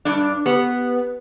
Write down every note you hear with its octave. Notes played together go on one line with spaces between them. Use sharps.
G2 D4
B3 G4 B4